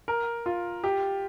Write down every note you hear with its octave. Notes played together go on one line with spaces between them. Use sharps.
A#4
F4
G4